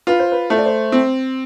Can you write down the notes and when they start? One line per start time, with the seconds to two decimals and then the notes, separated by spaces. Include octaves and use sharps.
0.07 F4 B4
0.20 C5
0.32 B4
0.50 A3 C5
0.57 D5
0.66 C5
0.92 C4